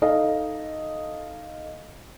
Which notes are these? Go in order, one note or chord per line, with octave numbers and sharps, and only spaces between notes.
D#4 A4 D#5 F5